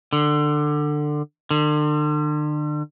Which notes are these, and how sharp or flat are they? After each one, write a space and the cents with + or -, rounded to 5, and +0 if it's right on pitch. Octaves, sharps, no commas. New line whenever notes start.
D3 +20
D3 +40